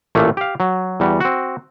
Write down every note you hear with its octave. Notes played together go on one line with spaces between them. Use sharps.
A1 A#2 A3 A#3
G4 F5
F#3
E2 G3 F#4
C4 F#4